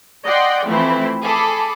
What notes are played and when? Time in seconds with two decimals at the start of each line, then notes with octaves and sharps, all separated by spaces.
0.24 D5 D#5 F#5 G5 C6
0.68 E3 F3 A3 C4 E4
1.23 G#4 A4 B5 D6